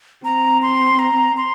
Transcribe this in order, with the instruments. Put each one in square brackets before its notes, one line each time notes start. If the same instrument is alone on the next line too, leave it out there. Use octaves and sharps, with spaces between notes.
[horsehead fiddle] C4 [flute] A#5
[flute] C6
A#5
C6